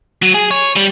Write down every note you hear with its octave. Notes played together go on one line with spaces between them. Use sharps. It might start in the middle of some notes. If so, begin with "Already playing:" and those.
F#3
G#4
C#5
G3